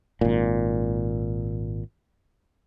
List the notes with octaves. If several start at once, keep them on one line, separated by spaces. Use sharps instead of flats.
G#1 A#2